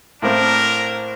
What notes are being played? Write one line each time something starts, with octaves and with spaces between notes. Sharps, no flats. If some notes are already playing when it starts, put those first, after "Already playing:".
A2 A#3 C4 D4 A#4